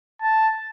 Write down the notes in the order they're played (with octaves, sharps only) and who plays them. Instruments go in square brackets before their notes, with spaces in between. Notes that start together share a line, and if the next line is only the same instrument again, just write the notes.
[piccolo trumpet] A5